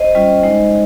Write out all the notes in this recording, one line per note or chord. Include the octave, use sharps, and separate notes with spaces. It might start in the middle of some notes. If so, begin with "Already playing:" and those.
Already playing: C5 D#5
G3 C#4 F4
G#3 D#4